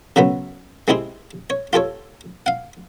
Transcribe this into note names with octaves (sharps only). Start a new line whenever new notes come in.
C#3 F#3 A3 B3
G#3 C4 E4 G4 G#4
C#5
F4 G4 A4 C#5
F5 F#5